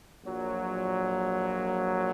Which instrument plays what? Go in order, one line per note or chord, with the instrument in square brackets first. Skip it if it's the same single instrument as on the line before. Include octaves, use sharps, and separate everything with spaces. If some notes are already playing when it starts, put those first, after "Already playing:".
[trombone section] A#1 A#2 F#3